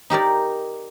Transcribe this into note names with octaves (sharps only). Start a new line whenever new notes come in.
D#4 G4 A#4 D5